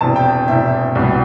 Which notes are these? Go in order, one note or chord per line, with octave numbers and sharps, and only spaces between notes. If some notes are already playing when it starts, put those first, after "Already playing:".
E1 E2 C3 E3 A5
G5
E1 E2 C3 E3 E5
C2 B2 G3 B3